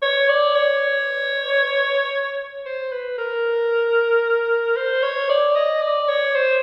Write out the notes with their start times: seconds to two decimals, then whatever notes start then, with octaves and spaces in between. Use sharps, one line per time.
0.02 C#5
0.28 D5
0.55 C#5
2.66 C5
2.92 B4
3.18 A#4
4.77 C5
5.03 C#5
5.30 D5
5.56 D#5
5.82 D5
6.08 C#5
6.35 C5